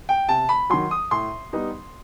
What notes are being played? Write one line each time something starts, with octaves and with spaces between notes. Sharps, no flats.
G5
C3 A5
B5
D#3 F#3 C6
D#6
A2 C6
G3 B3 D#4